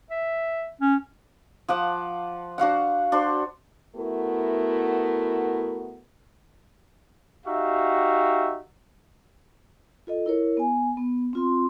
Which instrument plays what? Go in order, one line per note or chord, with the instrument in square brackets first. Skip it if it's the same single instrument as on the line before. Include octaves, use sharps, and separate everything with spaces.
[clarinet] E5
C#4
[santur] F3 F#5 D6
D4 F#4 F5 F#5
D4 F#4 C5
[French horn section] A3 B3 E4 F#4 A#4
[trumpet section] D#4 F#4 G4 E5 F5
[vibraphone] F4 A4 D#5
E4 A#4 C#5
B3 G#5
B3
C4 F4 C6